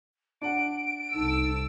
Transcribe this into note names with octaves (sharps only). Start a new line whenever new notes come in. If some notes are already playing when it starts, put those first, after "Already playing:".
D4 F#5 D7
C2 D#4 A4 E6